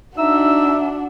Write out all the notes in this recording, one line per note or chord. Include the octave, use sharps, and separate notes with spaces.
D4 D#4 F#4 E5 E6